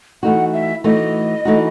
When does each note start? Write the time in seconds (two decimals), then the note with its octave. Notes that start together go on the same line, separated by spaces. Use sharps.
0.23 E3 A3 D#4 F#4 F#5
0.53 E5
0.84 E3 A3 D#4 F#4 D#5
1.45 E3 A3 D#4 F#4